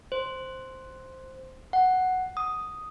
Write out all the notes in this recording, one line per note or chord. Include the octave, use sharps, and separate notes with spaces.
C5
F#5
D#6